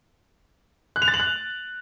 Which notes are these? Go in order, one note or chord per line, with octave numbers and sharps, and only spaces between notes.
F#6
F7
A6
F#7
F#6